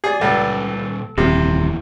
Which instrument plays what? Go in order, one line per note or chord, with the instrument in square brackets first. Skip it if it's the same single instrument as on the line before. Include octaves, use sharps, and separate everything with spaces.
[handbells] G4 D5 [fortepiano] G#4
[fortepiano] C#2 [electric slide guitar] A#2 G3 G#5 [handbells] A4
[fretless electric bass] D#1 [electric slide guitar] F2 E3 [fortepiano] C3